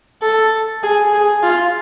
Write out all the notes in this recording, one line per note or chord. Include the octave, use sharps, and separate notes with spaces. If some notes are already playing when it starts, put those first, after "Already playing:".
A4
G#4
G#4
F4